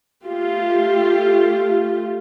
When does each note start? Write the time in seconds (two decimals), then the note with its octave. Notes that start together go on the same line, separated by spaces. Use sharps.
0.25 A3 F4 G4